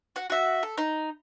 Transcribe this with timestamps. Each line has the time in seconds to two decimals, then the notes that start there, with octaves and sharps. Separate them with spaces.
0.16 F#4 F#5
0.30 F#4 E5
0.63 A4
0.78 D#4